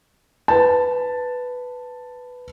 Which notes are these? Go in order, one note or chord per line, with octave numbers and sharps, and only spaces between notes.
B4 A5